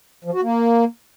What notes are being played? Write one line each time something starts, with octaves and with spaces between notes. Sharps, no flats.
F3
F#4
A#3